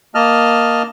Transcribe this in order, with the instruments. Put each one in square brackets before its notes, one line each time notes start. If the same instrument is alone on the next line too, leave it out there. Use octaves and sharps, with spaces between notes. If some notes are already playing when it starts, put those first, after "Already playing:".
[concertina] A#3 D#5 A5 F6